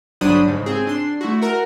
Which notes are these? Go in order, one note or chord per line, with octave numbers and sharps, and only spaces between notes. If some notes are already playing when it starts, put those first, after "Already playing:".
G1 F#3 D4 C5 B5 D#6
G#2 C#3
C4 G#4
D4 C6
A3 E4 F#4
F#4 A#4 F6